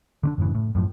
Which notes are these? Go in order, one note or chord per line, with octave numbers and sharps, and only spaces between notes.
D3 C4 D4
F#2 A2 C#3 E3
A2
F#2 A2 F3